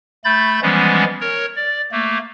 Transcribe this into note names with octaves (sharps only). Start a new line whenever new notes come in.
A3 B5 G6 A6
E3 F3 G3 G#3 B3 C#4
A#4 C#5
D5
A3 A#3